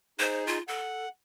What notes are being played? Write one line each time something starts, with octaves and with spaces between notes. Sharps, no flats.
D#4 G#4 C5
F4
A4 F#5